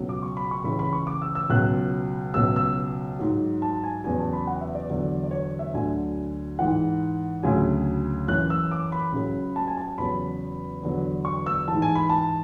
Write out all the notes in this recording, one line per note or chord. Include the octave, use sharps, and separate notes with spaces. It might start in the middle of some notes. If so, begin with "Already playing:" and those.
Already playing: C#2 B2 F#3
D6
C#6
B5
C#6
C#2 C#3 E3 B5
B5
C#6
D6
E6
E6
C#2 B2 F#3 F#6
C#2 B2 F#3 E6
E6
G#2 F#3
A5
G#5
E2 C#3 F#3 G#5
A5
B5
F#5
E5
D5
E2 D3 F#3
D5
C#5
E5
D2 D3 F#3 G#5
G#2 E3 F#5
D2 C#3 F#3 G#5
F#2 E3 F#6
E6
D6
B5
C#2 C#3 F#3
A5
G#5
A5
E2 C#3 F#3 B5
E2 D3 F#3
C#6
E6
G#2 E3 A5
G#5
B5
A5